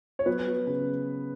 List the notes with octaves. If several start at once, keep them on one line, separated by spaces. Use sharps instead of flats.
C#5
F#3 B3 B4
F#3
C#3